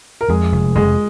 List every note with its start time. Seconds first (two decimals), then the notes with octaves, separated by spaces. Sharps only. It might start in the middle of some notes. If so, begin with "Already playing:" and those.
0.21 A#4
0.29 F2 G#3 G#4
0.52 F1
0.76 F1 G#3 G#4